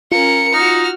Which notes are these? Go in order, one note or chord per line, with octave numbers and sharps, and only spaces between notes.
C#4 F4 A#4 C#7
D#4 F#4 F6